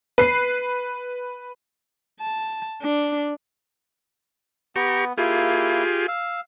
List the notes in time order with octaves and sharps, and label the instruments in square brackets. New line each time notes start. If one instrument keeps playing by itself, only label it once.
[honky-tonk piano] B4 C7
[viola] A5
D4
[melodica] B3 [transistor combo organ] G4 A#5 C#6
[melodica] A#3 E4 [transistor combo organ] F4 G4 G#4
[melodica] F5 E6